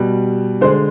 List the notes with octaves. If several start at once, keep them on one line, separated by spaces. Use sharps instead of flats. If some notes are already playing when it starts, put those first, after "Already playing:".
Already playing: B2 G3
D3 G#3 C5